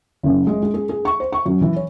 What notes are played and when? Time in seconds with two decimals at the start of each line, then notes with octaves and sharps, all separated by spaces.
0.23 F#1
0.47 G#3
0.63 G#3
0.74 G#4
0.89 G#4
1.05 C#6
1.20 C5
1.32 C#6
1.46 F#2
1.61 E3
1.76 C#5